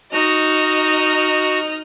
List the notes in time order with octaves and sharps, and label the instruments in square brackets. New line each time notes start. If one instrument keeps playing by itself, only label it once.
[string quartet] D#4 D#5 F6 [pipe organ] F#4